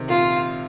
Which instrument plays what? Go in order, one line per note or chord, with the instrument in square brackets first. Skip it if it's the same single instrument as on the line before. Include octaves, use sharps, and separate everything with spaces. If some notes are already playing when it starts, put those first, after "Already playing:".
Already playing: [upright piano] C3 D#3
[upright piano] A#2 [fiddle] F4